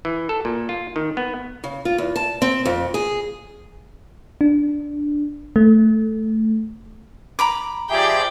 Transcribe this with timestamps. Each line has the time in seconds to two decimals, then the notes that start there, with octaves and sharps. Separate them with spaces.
0.05 E3
0.29 A4
0.45 A#2
0.69 F4
0.96 D#3
1.17 B3
1.64 C#3
1.85 F4
1.98 E2
2.16 A5
2.42 C4
2.66 F2
2.94 G#4
4.41 D4
5.56 A3
7.39 A#5 B5 D6
7.90 F3 G4 G#4 D5 E5 G5